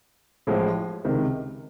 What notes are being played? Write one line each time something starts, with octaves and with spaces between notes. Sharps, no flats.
A1 A2 F3 G#3
C#2 C3 D#3